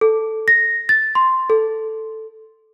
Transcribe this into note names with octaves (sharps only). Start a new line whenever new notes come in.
A4
A#6
A6
C6
A4